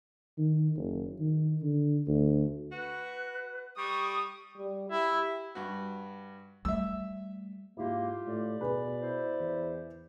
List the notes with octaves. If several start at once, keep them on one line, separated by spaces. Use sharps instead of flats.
D#3
F#1
D#3
D3
D2
F#4 B4
G3 C#6 D#6
G3
E4 G4
G2 F#4
G3 A3 E5 E6
G#2 A#3 E4 F4 G4
A2 D5
B2 G#4 B4
E4 C5
E2